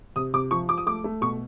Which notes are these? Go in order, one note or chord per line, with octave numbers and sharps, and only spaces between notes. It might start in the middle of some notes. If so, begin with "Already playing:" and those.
C3 D#6
C3 D6
F3 C#6
F3 D6
D#6
A3 D6
A3
B2 C#6